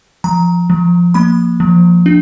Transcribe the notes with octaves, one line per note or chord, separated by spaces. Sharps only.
F3 A#5
F3
A#3 B5
F3
D4